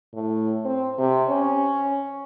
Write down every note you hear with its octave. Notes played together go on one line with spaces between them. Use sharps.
A2
C4
C3
C#4